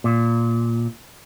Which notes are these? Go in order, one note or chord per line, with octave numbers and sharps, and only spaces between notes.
A#2